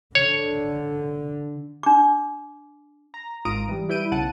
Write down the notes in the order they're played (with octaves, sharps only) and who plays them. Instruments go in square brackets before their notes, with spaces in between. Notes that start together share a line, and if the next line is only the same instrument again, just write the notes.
[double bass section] D3 [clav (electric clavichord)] C#5
[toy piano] D4 D6
[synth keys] A#5
G#1 F4 A#5 D#6 D7
E3 G3
G3 E4 B4 G6 D7 D#7
B1 C#3 F#5 A5 D#7